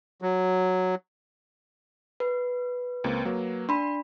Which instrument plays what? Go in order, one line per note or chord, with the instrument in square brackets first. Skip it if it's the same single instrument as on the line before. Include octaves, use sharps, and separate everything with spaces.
[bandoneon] F#3
[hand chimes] B4
[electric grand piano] C#2 A#3 C4
F#3 A#3
[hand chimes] D4 B5 [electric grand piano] C6